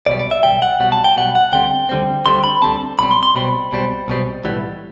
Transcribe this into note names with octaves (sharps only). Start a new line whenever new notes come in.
B1 B2 G3 D5
D5
E5
B2 G3 G5
B1
F#5
B1 B2 G3 F#5
A5
G5
B1 B2 G3 F#5
F#5
D2 D3 G3 C4 G5
D2 D3 G3 C4
D2 D3 G3 C4 C6
B5
D2 D3 G3 C4 A5
B1 B2 G3 C4 B5
C6
C6
B1 B2 G3 C4 B5
B1 B2 G3 C4
B1 B2 G3 C4
B1 A2 E3 G3 B3